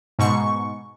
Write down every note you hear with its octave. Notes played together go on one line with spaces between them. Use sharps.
G#2 B2 C#6